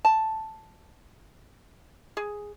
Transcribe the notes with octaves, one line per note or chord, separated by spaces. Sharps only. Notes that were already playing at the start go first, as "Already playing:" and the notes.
A5
G#4